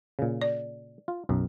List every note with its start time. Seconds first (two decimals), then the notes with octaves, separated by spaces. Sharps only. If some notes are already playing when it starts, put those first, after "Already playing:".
0.19 A#2 C#3
0.42 D5
1.08 F4
1.29 B1 F#2 A#4